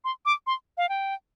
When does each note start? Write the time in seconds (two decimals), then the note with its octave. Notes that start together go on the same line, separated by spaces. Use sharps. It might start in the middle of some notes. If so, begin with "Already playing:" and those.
0.04 C6
0.25 D6
0.47 C6
0.77 F5
0.89 G5